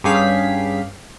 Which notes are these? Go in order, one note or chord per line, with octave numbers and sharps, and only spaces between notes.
G2 C#4 G4 G#4 F5 B6